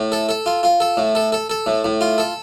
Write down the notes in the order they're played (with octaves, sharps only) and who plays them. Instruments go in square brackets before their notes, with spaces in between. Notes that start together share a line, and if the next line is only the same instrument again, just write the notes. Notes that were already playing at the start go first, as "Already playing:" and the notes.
Already playing: [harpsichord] A2
A4
A4
F4
F4
A4
A2
A4
A4
A4
A2
A2
F4
A4